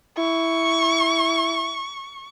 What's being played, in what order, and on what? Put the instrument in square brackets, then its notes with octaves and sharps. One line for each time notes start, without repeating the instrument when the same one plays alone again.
[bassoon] E4 [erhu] C#6